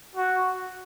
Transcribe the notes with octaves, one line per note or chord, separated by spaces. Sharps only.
F#4